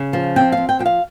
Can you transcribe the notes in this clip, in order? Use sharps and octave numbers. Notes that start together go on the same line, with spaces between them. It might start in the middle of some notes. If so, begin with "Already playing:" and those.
Already playing: C#3
F3
C4 G5
C4 F5
G5
F3 G5
F5